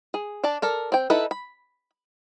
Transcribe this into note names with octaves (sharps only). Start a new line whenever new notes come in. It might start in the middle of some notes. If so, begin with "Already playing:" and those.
G#4
D4 D5 A5
A4 A#4 D5
C4 G5
D#4 E4 A4 B4
B5